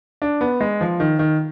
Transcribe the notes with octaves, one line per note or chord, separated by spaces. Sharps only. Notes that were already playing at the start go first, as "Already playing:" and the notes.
D4
B3
G#3
F3
D#3
D#3